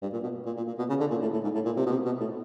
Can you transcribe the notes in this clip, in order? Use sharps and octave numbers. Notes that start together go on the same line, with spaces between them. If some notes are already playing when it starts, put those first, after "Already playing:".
G2
A#2
B2
A#2
A#2
A#2
B2
C#3
D3
A#2
A2
A2
G#2
A2
A#2
C3
B2
C3
B2
A2